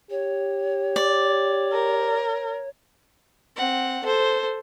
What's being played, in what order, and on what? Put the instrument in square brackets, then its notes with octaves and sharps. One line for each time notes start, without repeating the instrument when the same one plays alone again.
[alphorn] G4 [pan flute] C#5
[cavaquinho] D5
[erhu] A#4
[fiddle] C4 F#5
A4 C5